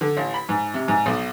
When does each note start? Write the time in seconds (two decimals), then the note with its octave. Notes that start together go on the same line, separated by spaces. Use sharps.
0.01 D3
0.17 A1
0.34 B5
0.49 G#2
0.74 C3
0.88 G#2
1.06 B1